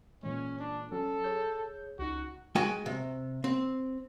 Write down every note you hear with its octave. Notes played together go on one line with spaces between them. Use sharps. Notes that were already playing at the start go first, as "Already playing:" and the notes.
A#2 E3 G#3 C#4
D4
F#3 C#4 A4
G#4 C#5 G6
C#2 D#4 F#4
G#3 F#4 G5 G#5
C3
C4